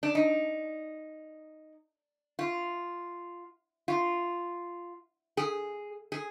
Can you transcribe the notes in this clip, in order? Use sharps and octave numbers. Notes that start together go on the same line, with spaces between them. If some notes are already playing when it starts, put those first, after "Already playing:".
D4
D#4
F4
F4
G#4
G#4